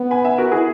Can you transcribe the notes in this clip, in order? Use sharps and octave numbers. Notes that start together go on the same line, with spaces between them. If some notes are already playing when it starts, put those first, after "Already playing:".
Already playing: B3
G#5 B5
E5 G#5
F#4 A#4
E4 G#4